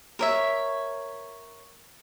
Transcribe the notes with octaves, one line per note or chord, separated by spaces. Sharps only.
A#4 C#5 E5